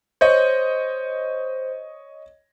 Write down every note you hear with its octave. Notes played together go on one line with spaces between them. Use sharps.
C5 C#5 D#5